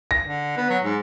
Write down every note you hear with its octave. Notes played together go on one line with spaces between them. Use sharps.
A#6
D3
B3
F#3
G#2